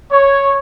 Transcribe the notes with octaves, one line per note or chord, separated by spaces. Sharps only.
C#5